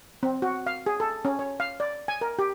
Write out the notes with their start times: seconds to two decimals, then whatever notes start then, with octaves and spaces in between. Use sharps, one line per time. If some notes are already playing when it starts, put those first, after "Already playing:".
0.23 C4
0.42 F#4
0.67 F5
0.86 G#4
1.00 A4
1.25 C#4
1.39 C#5
1.60 F5
1.80 D5
2.08 G#5
2.21 A#4
2.39 G4